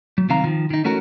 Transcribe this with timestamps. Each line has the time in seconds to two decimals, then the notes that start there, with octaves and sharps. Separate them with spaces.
0.18 F#3
0.29 C2 D#3 C4 F5 A#5
0.44 D#3 F3
0.70 D#3 D#4
0.84 E3 A3 C#4 F#4 A#4